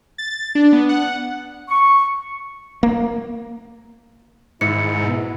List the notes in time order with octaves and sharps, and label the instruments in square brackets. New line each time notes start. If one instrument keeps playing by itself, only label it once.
[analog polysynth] A6
D4
B3
F#5
[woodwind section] C#6
[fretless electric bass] A#3
[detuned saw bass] G#2 [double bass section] D#3 [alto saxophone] E4 [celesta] C#7
[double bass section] B2 B3